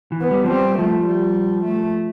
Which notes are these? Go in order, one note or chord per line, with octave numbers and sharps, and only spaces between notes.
E3
B3
G3
F3
G3 C4
F3 A3
G3
A3